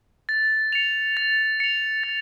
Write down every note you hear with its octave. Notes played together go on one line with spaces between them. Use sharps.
A6
C#7 F7
A6
C#7 F7
A6